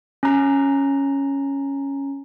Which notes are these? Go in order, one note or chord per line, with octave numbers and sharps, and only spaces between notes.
C#4 A#5